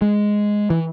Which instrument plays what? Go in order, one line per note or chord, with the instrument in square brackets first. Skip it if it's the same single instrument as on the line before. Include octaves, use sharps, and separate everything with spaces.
[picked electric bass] G#3
E3